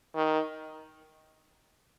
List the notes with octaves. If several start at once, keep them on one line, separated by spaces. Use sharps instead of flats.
D#3